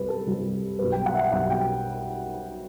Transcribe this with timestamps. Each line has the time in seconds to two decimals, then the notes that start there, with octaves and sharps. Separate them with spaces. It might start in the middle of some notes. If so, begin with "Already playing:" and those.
Already playing: C2 C3 G3 B4
0.09 A4
0.26 C2 C3 G3
0.79 B1 B2 G3 B4
0.92 G5
1.06 F#5
1.14 E5
1.19 F#5
1.32 B1 B2 G3 F#5
1.50 G5